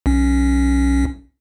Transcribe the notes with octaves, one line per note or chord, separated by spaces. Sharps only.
B1 C#4